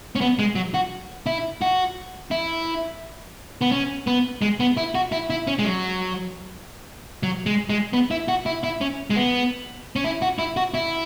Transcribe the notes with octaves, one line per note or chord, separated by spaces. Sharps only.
C#4
B3
G#3
F#3
F#4
E4
F#4
E4
B3
C#4
B3
G#3
B3
E4
F#4
E4
E4
C#4
G#3
F#3
F#3
G#3
G#3
B3
E4
F#4
E4
E4
C#4
G#3
B3
C#4
E4
F#4
E4
F#4
E4